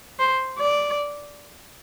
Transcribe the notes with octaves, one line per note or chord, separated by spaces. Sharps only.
C5
D5